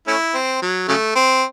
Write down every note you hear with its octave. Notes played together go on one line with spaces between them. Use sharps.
A3 C#4 E4
C4
F#3
C#3 F#3 A3
C4